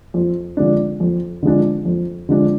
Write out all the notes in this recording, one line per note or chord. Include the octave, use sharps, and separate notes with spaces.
F2
D3 F3 G#3 D4
F2
D3 F3 G#3 D4
F2
D3 F3 G#3 D4